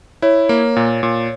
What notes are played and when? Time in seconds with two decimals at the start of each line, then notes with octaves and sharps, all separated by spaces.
0.22 E4 C#5
0.49 A#3
0.76 A#2
1.03 A#2